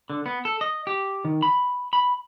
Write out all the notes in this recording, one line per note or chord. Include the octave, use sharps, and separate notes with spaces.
D3
B3
A4
D#5
G4
D#3
B5
B5